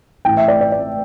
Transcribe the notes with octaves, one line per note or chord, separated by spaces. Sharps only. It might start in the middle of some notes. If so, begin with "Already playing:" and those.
A1 A2 E3 G5
E5
D5
D5
D5